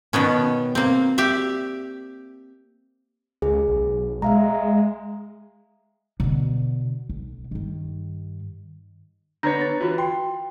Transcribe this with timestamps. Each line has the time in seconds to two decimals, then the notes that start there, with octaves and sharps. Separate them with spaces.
0.13 B2 D#3 B3 C#4
0.75 A#3 C4
1.18 G4 D5 E5
3.42 C#2 G#4
3.68 B1
4.22 G#3 E5 F5 A#5
6.20 B2 D3
7.09 B1
7.51 G2 D#3
9.43 D3 B3 C#5 A#5 G6 A#6
9.61 A6
9.81 E3 F4 F#4 B4
9.98 G5 C6